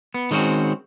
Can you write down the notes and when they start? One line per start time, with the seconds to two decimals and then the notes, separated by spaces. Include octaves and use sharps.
0.14 B3
0.31 D#3 G#3 C4 C#4 F#4